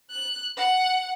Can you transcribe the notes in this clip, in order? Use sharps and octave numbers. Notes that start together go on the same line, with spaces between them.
F#6
F#5